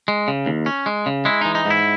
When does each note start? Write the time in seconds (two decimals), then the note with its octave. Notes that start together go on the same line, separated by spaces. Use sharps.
0.08 G#3
0.28 C#3
0.46 D#2
0.66 C#4
0.86 G#3
1.06 C#3
1.25 G#3 E4
1.41 E3 D#4
1.55 D#4
1.65 G#2 E4